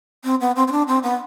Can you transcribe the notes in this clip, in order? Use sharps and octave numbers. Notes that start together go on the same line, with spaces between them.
C4
B3
C4
C4
D4
C4
B3